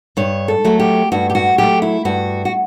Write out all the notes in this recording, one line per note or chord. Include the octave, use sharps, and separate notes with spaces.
G2 C#5
A4
F#3 A3
G4
G2 F#4
G4
F#4
F#3 A3 G4
E4
G2 F#4
F#4